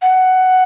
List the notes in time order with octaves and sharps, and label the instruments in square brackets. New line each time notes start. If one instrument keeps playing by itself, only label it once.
[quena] F#5